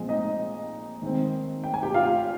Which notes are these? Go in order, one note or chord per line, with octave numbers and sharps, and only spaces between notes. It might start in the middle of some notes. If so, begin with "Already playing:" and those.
Already playing: A#2 F3 G#3 C4
D#4 D#5
D#3 G#3 C4
G5
G#5
G4 G5
F4 F5